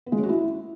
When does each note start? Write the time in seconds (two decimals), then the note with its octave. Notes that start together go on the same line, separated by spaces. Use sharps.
0.06 B3
0.12 G#3
0.18 C#4
0.23 F#4
0.29 E4